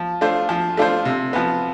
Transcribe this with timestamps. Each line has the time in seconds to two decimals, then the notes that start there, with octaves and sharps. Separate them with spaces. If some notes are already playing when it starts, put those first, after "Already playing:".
Already playing: F3
0.21 A3 D4 F4 C5
0.49 F3
0.77 A3 D4 F4 C5
1.05 C3
1.33 F3 B3